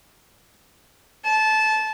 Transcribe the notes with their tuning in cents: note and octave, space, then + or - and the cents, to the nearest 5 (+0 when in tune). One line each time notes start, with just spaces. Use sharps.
A5 -20